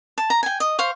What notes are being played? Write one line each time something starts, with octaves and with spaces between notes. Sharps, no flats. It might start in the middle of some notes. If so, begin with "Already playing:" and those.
A5
A#5
G5 G#5
D#5
C5 F5 C#6